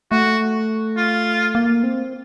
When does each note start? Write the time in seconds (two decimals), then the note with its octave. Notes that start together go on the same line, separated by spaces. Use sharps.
0.11 A3 F#4
0.97 F4
1.55 A#3
1.83 C4